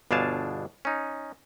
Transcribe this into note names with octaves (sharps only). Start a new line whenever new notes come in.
G1 B2 D4 F5 G#5 A5
C#4 D#4